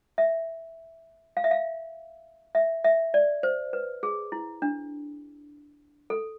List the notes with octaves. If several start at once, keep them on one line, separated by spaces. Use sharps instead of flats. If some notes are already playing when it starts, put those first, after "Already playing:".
E5
F5
E5
F5
E5
E5
D5
C5
B4
G#4
E4
D4
A4